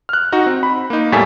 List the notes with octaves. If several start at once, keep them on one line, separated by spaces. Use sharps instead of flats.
F6 F#6
D#4 F#4
C4
B5
A#3 D#4
E2 A2 G3 A4 G#5 B6